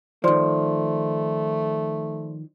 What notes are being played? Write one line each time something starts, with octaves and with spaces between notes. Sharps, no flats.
D#3 F3 A3 C5 D5 C6